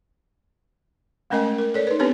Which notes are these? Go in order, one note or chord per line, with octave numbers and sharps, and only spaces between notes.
G#3 A3 C#4 A#4 D#5 G#5
A#4
A4 C#5 D5
D#4 B4
B3 C4 D4 G4 B4 C#5